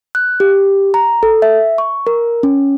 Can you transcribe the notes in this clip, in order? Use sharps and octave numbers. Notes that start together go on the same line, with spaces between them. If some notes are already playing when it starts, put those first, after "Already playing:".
F#6
G4
A#5
A4
E5
C#6
A#4
C#4